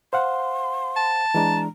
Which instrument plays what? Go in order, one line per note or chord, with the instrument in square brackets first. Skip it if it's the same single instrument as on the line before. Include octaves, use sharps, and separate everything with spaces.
[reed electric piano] C5 F5 F#5 [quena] C6
[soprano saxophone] A5
[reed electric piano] E3 G#3 D4 [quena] A#5